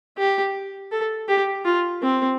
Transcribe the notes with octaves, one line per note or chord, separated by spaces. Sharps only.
G4
A4
G4
F4
C4